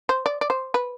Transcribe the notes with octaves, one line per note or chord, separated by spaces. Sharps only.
C5
D5
D5
C5
B4